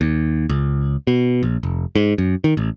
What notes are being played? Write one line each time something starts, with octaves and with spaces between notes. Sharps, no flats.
D#2
C#2
B2
A#1
F1
G#2
F#2
D#3
A1